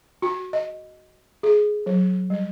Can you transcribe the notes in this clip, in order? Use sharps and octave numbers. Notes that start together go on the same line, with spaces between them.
F#4
D#5
G#4
F#3
G3